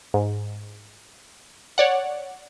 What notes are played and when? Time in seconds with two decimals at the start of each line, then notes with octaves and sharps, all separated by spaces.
0.14 G#2
1.78 C#5 D5 F#5